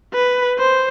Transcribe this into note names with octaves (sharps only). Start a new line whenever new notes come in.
B4
C5